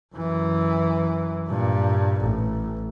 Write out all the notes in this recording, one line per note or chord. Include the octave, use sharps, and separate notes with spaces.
F#2 E3
G2 A#2
A1